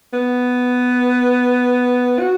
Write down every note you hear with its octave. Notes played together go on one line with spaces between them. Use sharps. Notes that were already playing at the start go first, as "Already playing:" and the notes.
B3
F#4